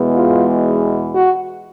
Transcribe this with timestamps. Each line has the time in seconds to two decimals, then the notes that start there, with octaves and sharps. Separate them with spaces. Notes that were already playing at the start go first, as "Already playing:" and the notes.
Already playing: E2 B2 G#3 B3
0.13 F4
1.14 F#4